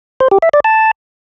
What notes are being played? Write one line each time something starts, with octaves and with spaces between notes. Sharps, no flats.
C5
G4
E5
D5
A5